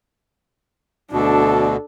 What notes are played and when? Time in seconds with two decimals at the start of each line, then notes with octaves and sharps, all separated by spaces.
1.13 D2 B2 D4 A4